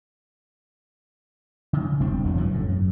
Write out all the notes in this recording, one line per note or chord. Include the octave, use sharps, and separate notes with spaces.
C#3
E1 G3 C4 D4
E1 E2 D#3 F#3
F#2 C#3 E3
A2
F#2